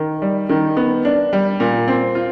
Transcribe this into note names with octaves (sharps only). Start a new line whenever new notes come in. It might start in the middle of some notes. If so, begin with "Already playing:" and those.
Already playing: D#3
G3
D#3
B3
D4
G3
A#2
C4
F4